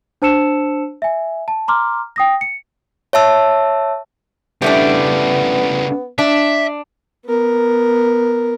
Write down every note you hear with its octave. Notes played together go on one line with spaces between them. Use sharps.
D4 C5 A5 E6 C#7 E7
E5 G#5
A5
A#5 C6 D6 F6
G5 D#6 A#6
C#7
C#5 E5 A5 E6
C#3 G3 A3 B3 D4 E4
D4 E5
B3 A#4